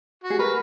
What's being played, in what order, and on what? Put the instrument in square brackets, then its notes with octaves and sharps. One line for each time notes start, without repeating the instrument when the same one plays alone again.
[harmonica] F#4
[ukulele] G#4
[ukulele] A#4 [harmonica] B4